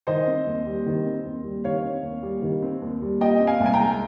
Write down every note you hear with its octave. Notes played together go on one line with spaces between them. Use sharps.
D#3 C5 D#5
C4
D#2
G3
D#3
C4
D#2
G3
D#3 C#5 F5
C4
D#2
G3
D#3
C4
D#2
G3
A#2 D#5 G5
C4
F5 G#5
C2
G#5
G5 A#5
G#3